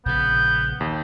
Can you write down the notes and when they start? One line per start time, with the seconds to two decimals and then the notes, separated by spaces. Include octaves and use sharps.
0.06 A#1 C#3 B3 G6
0.80 D#2